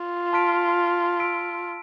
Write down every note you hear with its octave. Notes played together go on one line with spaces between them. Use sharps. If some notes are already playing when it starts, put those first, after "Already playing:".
Already playing: F4
A5 C6 F6 B6 D7
E6 B6 D7